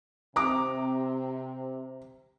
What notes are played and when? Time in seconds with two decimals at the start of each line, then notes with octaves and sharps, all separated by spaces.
0.36 C3 A#5 D6